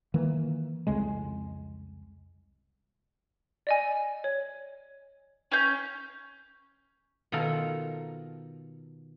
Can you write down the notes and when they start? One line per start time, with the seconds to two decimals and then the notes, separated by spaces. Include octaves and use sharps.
0.14 D#3 E3 A#3
0.87 C2 F2 C#3 G#3
3.67 D5 D#5 G#5
4.24 C#5
5.52 C#4 G6
7.32 B2 D#3 F4 A4 A#4